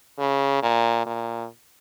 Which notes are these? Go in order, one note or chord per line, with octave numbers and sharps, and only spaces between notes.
C#3
A#2
A#2